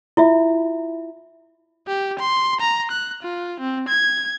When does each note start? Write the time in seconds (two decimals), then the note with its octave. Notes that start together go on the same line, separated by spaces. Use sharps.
0.17 E4 F4 E5
1.87 G4
2.20 C6
2.61 A#5
2.91 F#6
3.23 F4
3.60 C4
3.89 G#6